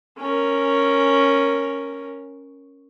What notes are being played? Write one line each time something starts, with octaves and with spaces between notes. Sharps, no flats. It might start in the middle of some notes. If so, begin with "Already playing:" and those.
C#4 A#4